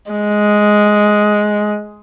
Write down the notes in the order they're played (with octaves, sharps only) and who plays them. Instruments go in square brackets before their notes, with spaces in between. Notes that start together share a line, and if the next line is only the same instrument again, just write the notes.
[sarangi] G#3